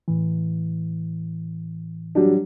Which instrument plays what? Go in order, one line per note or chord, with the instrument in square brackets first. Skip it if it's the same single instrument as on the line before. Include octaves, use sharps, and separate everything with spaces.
[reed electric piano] A2 E3
[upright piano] F#3 G3 D4